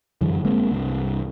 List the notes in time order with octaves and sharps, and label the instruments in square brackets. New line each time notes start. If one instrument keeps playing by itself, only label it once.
[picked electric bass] F#2 D3 E3
G1 G#3 A#3 C4
C2 G2